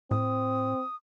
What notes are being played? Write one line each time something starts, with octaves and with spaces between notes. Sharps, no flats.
A2 C4 D#6